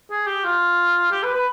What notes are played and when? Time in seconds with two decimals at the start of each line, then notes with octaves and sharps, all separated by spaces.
0.10 G#4
0.27 G4
0.44 F4
1.11 G4
1.23 B4
1.34 B4